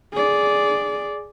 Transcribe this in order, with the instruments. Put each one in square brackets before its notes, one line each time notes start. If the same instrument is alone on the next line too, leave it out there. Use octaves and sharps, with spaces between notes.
[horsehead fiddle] G#4 D5